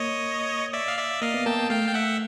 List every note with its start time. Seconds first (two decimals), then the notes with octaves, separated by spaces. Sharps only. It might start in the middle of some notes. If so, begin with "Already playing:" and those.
Already playing: A#3 C#5 D#5
0.73 D5 E5
0.88 F5
0.98 D5 E5
1.22 A#3 D#5 F5
1.34 B3
1.46 A#3 G5 A5
1.70 A3 F5 G5
1.88 G5
1.94 E5 F#5